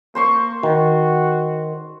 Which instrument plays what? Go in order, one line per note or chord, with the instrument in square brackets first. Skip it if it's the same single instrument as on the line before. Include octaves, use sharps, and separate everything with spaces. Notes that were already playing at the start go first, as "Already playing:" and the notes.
[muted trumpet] A#3 [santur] C5 C6 C#6
[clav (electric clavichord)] D#3 [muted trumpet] F#4